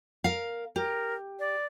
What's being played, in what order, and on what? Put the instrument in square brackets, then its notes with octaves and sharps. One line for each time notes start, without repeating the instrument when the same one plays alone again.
[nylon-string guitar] A#4 F5
[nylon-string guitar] G4 [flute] A#4
[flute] D5